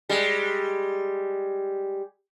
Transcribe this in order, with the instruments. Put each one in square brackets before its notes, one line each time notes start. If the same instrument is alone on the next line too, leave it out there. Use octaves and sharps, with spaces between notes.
[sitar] G3 G#3